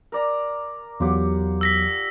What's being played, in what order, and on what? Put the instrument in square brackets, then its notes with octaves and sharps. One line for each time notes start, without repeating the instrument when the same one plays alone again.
[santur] A#4 D5 A#5
[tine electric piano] E2 F#3 [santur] F4 G4 F#5
[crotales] E6 A#6 B6